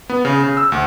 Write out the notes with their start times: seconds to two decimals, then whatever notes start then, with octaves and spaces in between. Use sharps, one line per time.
0.10 B3
0.25 C#3
0.44 C#3
0.57 E6
0.72 D2